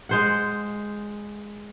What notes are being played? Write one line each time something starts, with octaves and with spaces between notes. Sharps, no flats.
G#3 C5 F#5